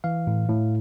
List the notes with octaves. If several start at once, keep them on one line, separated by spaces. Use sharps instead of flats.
E3 F5
A2
A2